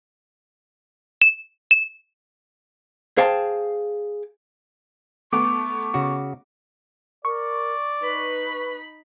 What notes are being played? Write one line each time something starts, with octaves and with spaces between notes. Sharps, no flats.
E7
E7
G#4 C5 F5 G5 A5
A3 B3 C#6 D6
C#3 F#4
A#4 D5 C#6
D#4 B4 B5